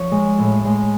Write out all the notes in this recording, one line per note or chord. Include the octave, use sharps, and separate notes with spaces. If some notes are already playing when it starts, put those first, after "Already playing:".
Already playing: F3 C#5
G#3
A2
G#3